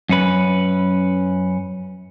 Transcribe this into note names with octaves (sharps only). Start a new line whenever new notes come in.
F#2 C#4 B4